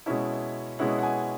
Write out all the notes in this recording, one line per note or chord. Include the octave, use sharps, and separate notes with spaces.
B2 G#3 C#4 E4 E5
B2 G#3 C#4 E4 F#5
F#5
G#5